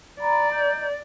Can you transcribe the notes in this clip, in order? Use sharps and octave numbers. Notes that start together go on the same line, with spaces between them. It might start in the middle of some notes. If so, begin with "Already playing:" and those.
D5 A#5 B5
D#5 A#5 G6